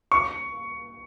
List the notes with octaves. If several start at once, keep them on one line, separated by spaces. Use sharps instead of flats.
C#6